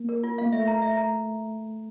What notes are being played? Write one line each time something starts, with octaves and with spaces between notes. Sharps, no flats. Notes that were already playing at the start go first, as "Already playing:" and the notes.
Already playing: A#3
A#4
F4
A#3 F5
A3 E5
A#5
E5
A#5